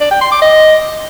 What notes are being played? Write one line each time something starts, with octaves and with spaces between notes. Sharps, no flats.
D5
G5
C6
D6
D#5